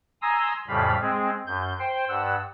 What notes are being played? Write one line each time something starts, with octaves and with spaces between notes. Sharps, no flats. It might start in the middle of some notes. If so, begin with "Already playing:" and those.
G#5 A#5 C6 D#6 E6
F2 A2 C#3 G3 F5 B5
G#3 C4 G#4
F#2 G6
C5 G5 C6
G2 F#5 E6